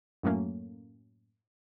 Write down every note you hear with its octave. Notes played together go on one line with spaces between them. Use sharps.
F#2 A2 F#3 A3 A#3 C#4